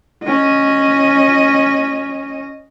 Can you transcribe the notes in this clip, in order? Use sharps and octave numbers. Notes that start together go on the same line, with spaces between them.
C#4 D#5